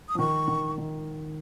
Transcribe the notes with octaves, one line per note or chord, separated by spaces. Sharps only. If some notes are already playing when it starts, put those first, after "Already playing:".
D#6
F3
D#3 C#6
D#3
D#3